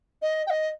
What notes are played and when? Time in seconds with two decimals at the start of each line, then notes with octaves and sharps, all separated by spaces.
0.22 D#5
0.47 G5
0.50 D#5